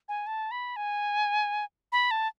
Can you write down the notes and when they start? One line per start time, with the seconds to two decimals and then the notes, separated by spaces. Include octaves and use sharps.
0.09 G#5
0.27 A5
0.51 B5
0.76 G#5
1.92 B5
2.11 A5